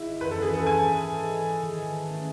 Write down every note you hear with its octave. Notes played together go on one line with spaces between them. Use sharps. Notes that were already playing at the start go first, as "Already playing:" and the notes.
Already playing: G#1 E4
F#2 E3 B4
A4
G#4
A4
G#2 G#5
E3 G#3 D#4 G#4
D#3
A3 C#4